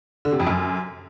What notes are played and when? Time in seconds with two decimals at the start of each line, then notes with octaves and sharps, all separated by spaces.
0.25 D3
0.32 C3
0.40 F2
0.47 F#2